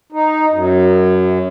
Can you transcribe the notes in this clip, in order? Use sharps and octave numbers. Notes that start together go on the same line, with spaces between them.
D#4
F#2